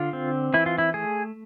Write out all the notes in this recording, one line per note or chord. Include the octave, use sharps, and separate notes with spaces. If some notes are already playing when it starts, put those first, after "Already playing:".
Already playing: D3 F4
C4
E3 E4
F4
E4
A3 G#4